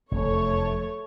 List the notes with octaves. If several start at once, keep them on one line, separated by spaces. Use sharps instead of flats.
F1 E2 A3 C#5